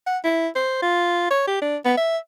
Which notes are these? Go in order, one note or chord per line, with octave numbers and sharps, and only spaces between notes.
F#5
E4
C5
F4
C#5
G4
D4
B3
E5